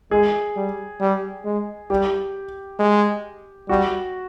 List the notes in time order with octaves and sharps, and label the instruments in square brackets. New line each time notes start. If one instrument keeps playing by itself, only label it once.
[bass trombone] G#3 [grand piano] G#4
[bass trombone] G3
G3
G#3
[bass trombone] G3 [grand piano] G4
[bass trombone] G#3
[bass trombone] G3 [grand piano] F#4